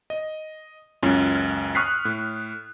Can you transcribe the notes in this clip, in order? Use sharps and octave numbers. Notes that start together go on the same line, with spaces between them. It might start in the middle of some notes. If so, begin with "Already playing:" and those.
D#5
C#2 F#2 C#4 F4
C#6 D#6 F6 F#6 B6 C7
A2